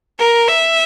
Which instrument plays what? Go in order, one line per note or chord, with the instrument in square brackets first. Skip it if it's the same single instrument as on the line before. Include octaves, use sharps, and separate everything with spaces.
[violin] A#4
E5